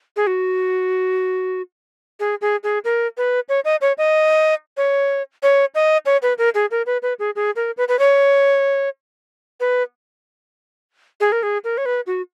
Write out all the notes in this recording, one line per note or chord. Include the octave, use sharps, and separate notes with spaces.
G#4
F#4
G#4
G#4
G#4
A#4
B4
C#5
D#5
C#5
D#5
C#5
C#5
D#5
C#5
B4
A#4
G#4
A#4
B4
B4
G#4
G#4
A#4
B4
B4
C#5
B4
G#4
A#4
G#4
A#4
C#5
B4
F#4